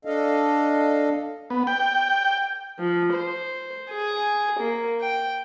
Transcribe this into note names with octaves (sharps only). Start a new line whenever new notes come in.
D4 A4 D#5 F5
B3
G5
F3
C5
G#4
A#3
G5